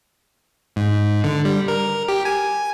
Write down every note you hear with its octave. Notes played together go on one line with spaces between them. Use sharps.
G#2
D3
G3
A#4
G4
G#5